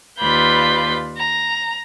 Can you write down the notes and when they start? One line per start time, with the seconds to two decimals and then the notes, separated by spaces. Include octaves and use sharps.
0.19 D#2 F4 B4 D5 B5 G6
1.17 A#5